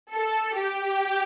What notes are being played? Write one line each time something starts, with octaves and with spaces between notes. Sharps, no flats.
A4
G4